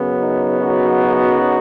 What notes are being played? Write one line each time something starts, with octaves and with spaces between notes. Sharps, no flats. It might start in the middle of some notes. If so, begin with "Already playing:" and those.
Already playing: F#2 C#3 F#3 B3
D#4
D#4 F#4